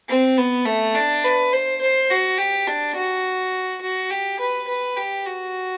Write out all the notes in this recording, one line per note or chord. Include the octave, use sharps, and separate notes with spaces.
C4
B3
A3
D4
B4
C5
C5
F#4
G4
D4
F#4
F#4
G4
B4
B4
G4
F#4